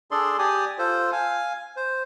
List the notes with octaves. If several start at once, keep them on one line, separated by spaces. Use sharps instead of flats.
D4 G#4 A4 D5 C6
G4 D5 G#5 D#6
F4 A4 C5
F5 G#5
C5